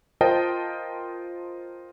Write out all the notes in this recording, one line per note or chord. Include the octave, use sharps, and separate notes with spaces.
F4 A#4 C5 D#5 G5 A5